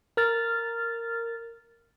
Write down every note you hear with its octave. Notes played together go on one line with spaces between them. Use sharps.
A#4 F6 A6